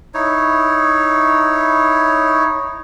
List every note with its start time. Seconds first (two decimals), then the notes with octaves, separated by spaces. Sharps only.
0.14 D#4 E4 C#5